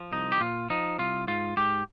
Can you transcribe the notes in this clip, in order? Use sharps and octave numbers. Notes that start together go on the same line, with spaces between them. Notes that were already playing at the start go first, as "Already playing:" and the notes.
Already playing: F3
C2 D#4
G4
A#2 F4
F3 D#4
C2 F4
G#2 F4
G#2 G4